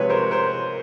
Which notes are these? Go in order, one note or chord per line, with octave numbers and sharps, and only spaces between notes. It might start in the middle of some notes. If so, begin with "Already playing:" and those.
Already playing: C3 F3 G#3 C4 B4 C#5
A#4 C5
A#4 C5